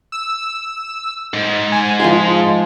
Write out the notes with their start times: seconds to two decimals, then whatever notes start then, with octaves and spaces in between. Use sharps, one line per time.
0.12 E6
1.34 G#2
1.72 G#5
2.00 F3 G#3 F4 G#4